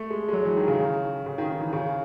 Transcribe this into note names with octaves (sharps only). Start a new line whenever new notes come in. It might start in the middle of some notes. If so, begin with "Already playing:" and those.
Already playing: A3
G#3
G#3
F#3
E3
D#3
C#3
C#3
D#3
D#3
E3
C#3